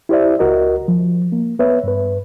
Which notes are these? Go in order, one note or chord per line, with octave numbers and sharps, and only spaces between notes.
E4 G4 C5 D5 E5
C#2 F#4 A#4 D#5
F3
A#3
B3 B4 C#5 E5
G2 B4